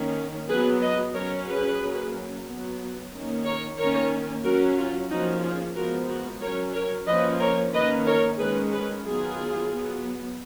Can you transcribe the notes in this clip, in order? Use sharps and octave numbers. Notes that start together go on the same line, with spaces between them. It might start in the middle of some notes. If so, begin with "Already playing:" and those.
Already playing: D#3 A#3 C#4
F#3 B3 G#4 B4
B4 D#5
F#3 C#4 A#4 C#5
G#4 B4
F#3 A#3 C#4
F#3 B3
D#3 A#3 C#4
A#4 C#5
D#3 A#3 C#4 A#4 C#5
F#3 C#4 F#4 A#4
F4
F3 A#3 C#4 D#4 F#4
F4 G#4
F3 G#3 B3 F#4 A#4
F#4 A#4
F#3 C#4 A#4 C#5
A#4 C#5
F3 A#3 C#4 B4 D#5
A#4 C#5
D#3 A#3 C#4 B4 D#5
A#4 C#5
D#3 G#3 C#4 G#4 B4
G#4 B4
D#3 F#3 B3 F4 G#4
F#3 B3